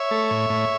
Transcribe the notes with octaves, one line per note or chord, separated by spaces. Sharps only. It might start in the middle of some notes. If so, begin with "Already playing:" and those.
Already playing: C#5 E5
A3
A2
A2